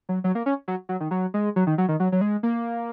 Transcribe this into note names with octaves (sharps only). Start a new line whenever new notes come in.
F#3
F#3
A#3
C#4
F#3
F#3
D#3
F#3
G#3
F#3
D#3
F#3
D#3
F#3
F#3
G#3
A#3